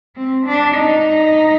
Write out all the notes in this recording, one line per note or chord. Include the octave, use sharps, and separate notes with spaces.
C4
D4
D#4